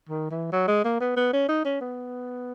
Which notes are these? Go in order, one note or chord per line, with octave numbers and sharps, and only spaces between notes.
D#3
E3
F#3
G#3
A#3
B3
B3
C#4
D#4
C#4
B3